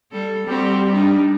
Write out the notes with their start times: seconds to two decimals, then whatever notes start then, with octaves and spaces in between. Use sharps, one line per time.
0.12 G3 A4
0.47 G3 C4 F#4 G4
0.93 D4 D#4